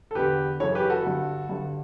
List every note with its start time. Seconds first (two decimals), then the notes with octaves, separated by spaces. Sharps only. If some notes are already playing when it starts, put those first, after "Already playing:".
0.11 A4
0.15 E2 D3 G4 B4
0.60 F#2 C#3 E3 A4 C#5
0.75 G4 B4
0.90 F#4 A4
1.05 G2 D3
1.49 G2 D3